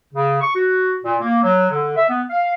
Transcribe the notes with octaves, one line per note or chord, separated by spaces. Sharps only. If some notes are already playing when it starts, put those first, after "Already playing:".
C#3
C#6
F#4
A#2
A#3
F#3
D3
E5
B3
F5